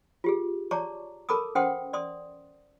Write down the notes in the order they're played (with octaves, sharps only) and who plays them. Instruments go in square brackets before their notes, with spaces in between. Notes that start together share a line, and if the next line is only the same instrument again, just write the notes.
[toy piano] F4 G4 G#4
C#5 D5 A5 A#5 C#6 D6
A4 A#4 A5 B5 D6 D#6
C#4 C5 F#5 G5 C6 D#6
D5 C6 D#6